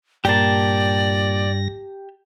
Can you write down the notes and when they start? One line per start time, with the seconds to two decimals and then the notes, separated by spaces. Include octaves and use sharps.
0.25 G2 A#2 A#3 G4 D5 A5 A#6